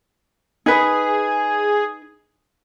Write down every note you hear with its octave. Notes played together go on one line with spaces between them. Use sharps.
D#4 G#4 B4